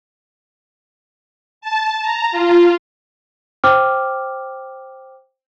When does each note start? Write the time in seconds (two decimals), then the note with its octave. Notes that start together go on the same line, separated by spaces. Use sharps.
1.61 A5
2.02 A#5
2.32 F4
3.64 C5 G5 D6 F6